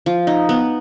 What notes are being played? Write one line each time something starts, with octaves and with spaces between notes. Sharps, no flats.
F3
D#4
B3